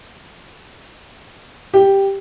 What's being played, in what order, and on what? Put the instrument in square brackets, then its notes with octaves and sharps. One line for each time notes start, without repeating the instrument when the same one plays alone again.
[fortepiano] G4